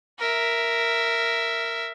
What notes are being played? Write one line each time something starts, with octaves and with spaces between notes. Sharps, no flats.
A#4 E5